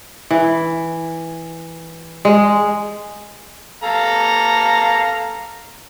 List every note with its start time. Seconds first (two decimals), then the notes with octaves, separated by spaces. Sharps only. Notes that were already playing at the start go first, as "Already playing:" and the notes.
0.31 E3
2.25 G#3
3.83 A4 F5 A#5